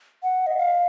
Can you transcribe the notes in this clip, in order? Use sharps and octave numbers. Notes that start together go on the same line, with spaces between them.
F#5
D#5
F5